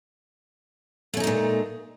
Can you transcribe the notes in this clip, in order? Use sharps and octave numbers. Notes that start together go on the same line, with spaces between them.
A#2 G#3 A3 C#4 D#4